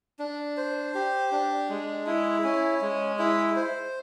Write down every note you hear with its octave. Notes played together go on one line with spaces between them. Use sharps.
D4
C5
G4
D4
G#3
E4
C#4
G#3
E4
C5